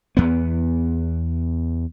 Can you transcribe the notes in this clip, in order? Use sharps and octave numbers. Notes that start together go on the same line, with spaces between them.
E2 B3